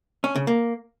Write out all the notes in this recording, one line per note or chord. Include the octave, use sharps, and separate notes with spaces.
C#4
C#3
A#3